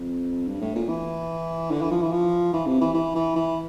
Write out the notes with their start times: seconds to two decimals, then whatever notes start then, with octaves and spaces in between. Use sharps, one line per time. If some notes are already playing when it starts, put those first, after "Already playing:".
Already playing: F2
0.47 G2
0.61 A2
0.75 A#2
0.88 E3
1.71 D3
1.81 E3
1.91 F3
2.02 E3
2.12 F3
2.53 E3
2.67 C3
2.81 E3
2.94 E3
3.15 E3
3.36 E3